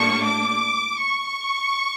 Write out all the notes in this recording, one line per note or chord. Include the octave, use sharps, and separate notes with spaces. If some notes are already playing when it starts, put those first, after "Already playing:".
Already playing: A2 G3 A#3 D4 C#6
D6
C#6